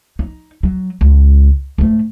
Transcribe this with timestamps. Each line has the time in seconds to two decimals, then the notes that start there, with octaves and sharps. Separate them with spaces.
0.19 D#4
0.63 F#3
1.01 C#2
1.78 G#2 A3